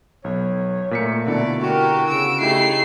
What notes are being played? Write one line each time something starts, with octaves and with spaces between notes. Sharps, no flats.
B1 C#5
A#2 A3 A#3 B6 C#7
B2 D3 E4 D5
F#4 G4 A#4
C#3 E6 D7
A3 D#4 E4 G4 C7